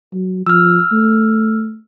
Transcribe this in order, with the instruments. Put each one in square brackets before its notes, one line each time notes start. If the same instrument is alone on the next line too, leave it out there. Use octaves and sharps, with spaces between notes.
[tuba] F#3
[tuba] F3 [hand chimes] E6 F6
[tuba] A3